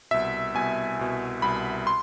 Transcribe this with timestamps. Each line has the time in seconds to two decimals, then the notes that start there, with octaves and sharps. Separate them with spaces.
0.11 C2 B2 E5
0.55 C2 B2 G#5
0.99 C2 B2
1.42 C2 B2 B5
1.87 C6